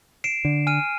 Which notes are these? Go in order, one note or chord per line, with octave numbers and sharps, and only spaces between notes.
C7 D7 E7
D3
G#5 F6 D#7